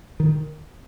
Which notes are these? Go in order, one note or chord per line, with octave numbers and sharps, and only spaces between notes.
D#3